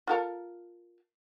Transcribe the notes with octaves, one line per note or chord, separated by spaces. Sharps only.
F4 A4 A#4